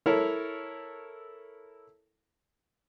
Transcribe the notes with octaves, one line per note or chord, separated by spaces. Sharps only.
E4 A4 A#4 C#5